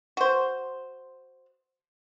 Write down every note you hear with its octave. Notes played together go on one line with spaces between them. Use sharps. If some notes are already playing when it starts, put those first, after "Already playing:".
F#4 C5